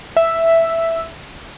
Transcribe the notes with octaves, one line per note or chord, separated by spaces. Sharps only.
E5